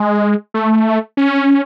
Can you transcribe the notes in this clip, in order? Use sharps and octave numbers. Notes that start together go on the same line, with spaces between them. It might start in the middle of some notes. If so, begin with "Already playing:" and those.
Already playing: G#3
A3
C#4